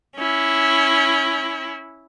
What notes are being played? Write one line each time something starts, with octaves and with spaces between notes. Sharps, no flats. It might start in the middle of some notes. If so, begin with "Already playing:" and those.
C#4 E4